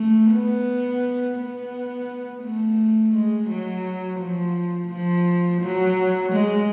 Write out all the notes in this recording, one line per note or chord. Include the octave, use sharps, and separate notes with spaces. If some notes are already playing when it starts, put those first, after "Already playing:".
Already playing: A3
B3
B3
A3
G#3
F#3
F3
F3
F#3
G#3